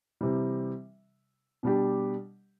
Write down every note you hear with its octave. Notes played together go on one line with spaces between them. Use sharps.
C3 E3 G3
B2 G3 D4 G4